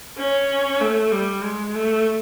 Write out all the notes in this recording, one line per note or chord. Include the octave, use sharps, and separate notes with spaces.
C#4
A3
G3
G#3
A3